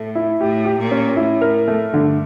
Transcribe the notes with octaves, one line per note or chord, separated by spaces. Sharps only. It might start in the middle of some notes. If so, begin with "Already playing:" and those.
Already playing: A2 A3
E4
A2 G4
G4
A#2
C#4
A2 E4
A#4
A3
G2 D3